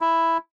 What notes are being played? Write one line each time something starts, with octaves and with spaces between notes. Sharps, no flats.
E4